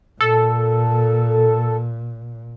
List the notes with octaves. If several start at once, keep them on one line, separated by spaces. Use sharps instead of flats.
A#2 A4